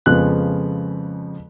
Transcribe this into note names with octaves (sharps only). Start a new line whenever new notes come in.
F2 C#3 F3 G#3 B3 F#6